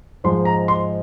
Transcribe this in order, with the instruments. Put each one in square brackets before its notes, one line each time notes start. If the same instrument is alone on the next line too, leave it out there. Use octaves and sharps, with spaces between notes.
[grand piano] G#2 F3 G#3 C6
A#5
C6